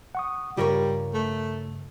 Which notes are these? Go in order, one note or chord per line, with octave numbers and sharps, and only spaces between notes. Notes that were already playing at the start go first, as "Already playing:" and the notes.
F#5 C#6 D#6
G2 C#3 G3 F4 A#4 C#5
A3